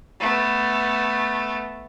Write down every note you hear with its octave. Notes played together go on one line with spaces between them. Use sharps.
A3 B3